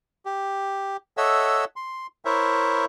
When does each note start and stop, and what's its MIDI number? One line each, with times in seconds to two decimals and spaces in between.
0.25 0.97 67
1.17 1.65 69
1.17 1.65 73
1.17 1.65 75
1.17 1.65 76
1.17 1.65 78
1.17 1.65 88
1.76 2.07 84
2.25 2.85 64
2.25 2.85 70
2.25 2.85 72
2.25 2.85 73
2.25 2.85 76